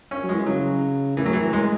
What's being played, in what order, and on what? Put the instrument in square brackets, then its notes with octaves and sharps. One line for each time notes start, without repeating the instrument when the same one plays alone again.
[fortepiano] C#4
[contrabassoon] F#3
[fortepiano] G#3
[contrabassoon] E3
[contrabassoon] C#3 [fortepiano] F#3
[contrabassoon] A2 [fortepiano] E3
[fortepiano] F#3
E3
G#3